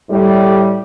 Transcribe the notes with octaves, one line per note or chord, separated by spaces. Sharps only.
A2 G3